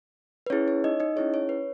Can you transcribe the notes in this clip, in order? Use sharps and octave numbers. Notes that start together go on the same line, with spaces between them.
B4
C#4 E4 G#4 C#5
C#5
D#4 D#5
D#4 D#5
C#4 E4 G#4 C#5
C#5
B4